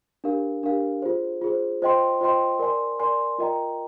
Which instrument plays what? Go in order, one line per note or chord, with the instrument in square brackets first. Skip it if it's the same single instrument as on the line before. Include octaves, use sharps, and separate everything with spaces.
[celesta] D4 G4 A#4 F5
D4 G4 A#4 F5
F4 G#4 C5
F4 G#4 C5
F4 C5 D#5 G5 C6
F4 C5 D#5 G5 C6
A#4 D5 G#5 C6
A#4 D5 G#5 C6
F4 A#4 D#5 G5 A#5